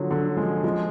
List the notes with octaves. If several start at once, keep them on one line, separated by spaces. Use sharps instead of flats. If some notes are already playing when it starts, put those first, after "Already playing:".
Already playing: D3 F3 F#3
D3 F#3
F3 G#3
F3 G#3